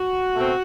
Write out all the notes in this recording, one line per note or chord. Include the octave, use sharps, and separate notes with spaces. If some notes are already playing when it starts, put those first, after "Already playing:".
Already playing: F#4
B2 A3 C4